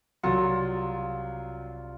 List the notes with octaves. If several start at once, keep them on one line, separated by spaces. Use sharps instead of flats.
C2 F#3 F4 A#6 C#7